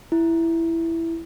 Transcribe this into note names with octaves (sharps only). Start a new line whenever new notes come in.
E4